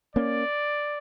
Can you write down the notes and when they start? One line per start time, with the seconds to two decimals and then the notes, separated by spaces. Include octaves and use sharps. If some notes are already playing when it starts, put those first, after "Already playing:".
0.16 A#3 C#4 D5